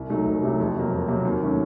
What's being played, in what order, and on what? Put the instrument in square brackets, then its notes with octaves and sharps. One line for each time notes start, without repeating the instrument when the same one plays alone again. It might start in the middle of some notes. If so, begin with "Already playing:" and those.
Already playing: [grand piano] C2
C3 F#3 A3 D#4
C2
C3 F#3 A3 D#4
F2
C3 F#3 A#3
F2
C3 F#3 A#3
D#2
D#3 F#3 A3 C#4